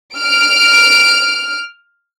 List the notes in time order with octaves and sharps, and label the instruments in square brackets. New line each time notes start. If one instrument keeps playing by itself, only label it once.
[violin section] F6 D7